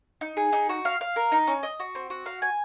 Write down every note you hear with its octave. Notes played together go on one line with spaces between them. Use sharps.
D#4
G#4
D#4
F#4
F5
F5
A#4
D#4
C#4
D#5
F#4
C4
F#4
F5
G#5